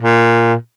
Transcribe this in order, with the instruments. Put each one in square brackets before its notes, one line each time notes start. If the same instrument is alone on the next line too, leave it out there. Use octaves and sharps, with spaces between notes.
[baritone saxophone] A#2